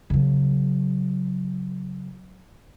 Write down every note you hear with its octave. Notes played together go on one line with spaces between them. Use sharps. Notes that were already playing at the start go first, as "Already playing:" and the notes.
C#3 F#3